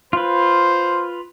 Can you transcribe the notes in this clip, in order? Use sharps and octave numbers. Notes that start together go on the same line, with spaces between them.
F4 B4 C5